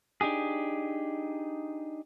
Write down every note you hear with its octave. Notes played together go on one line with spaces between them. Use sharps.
D4 D#4 G4 G#4